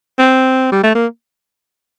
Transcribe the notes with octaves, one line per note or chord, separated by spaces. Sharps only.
C4
G3
A3
A#3